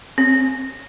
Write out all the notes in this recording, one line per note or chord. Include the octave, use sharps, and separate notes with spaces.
C4